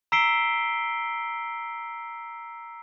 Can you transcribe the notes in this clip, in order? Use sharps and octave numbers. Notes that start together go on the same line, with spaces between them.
A#5 E6 B6 C7 D7 G7